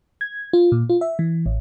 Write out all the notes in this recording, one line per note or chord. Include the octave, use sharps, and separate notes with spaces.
G#6
F4
A#2
F4
E5
E3
A1